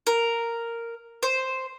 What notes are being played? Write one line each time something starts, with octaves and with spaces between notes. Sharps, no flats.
A#4
C5